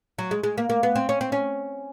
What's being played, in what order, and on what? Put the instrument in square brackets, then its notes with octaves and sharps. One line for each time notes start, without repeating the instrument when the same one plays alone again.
[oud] F#3
G#3
G#3
A#3
A#3
B3
C4
C#4
C4
C#4